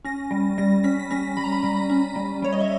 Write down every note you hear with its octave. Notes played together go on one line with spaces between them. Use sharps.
C#4 A#6
G3
G3 A#6
C#4 B6
B6
C#4 A#6
G3 B5
A#5
B5
G3
C#4
G3
G3 C#5
D#5
E5